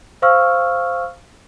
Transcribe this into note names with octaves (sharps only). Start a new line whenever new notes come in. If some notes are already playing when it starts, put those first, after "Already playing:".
C5 F5 C#6 E6 F6